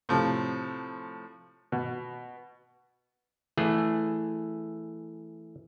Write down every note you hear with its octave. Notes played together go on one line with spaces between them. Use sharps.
A2 C3 F3
B2
E3 A3 G#4